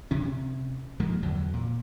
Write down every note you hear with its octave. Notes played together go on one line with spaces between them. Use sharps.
C3 C#4
G#2 F3 A#3
E2 D3 F#3
A#2